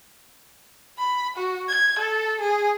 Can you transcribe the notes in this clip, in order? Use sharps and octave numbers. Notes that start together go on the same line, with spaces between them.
B5
F#4
G#6
A4
G#4